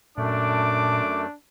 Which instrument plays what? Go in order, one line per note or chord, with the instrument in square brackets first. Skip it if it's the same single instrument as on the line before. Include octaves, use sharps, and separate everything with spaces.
[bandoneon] F#2 A3 [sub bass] A#2 [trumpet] D4 [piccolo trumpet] D6